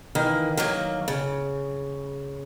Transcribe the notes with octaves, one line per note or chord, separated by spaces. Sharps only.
D#3 E3 A#3
D#3 F#3 A#3
C#3